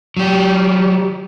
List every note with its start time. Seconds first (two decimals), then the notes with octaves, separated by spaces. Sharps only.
0.17 F#3 G4